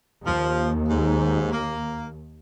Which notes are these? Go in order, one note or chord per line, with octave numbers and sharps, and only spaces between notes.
D#2 F3
G#2
A#3